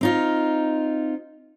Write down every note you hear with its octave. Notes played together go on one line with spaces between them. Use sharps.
C4 D#4 F4